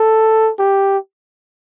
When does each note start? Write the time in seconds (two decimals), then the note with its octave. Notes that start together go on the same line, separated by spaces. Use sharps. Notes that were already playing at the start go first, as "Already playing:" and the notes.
Already playing: A4
0.59 G4